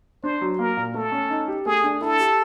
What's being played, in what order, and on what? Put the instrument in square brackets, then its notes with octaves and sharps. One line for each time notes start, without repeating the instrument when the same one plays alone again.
[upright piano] D4 [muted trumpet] C5
[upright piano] F#3
[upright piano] A#3 [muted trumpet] A#4
[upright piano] A#2
[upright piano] A3 [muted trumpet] A4
[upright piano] C#4
D#4
G4
[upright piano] A3 [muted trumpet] G#4
[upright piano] D4
[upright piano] E4 [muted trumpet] A4
[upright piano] G4